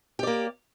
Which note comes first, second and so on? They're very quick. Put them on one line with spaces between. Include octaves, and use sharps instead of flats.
G4 D5 A#3